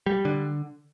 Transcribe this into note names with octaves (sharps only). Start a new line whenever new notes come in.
G3
D3